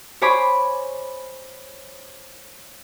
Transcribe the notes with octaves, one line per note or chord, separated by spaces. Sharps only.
C5 C#5 G#5 B5 D6